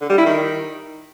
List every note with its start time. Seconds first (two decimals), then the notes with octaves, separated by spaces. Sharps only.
0.01 D3
0.09 G3
0.18 E4
0.26 D#3